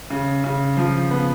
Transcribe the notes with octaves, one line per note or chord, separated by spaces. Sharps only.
C#3
C#3
F3
B3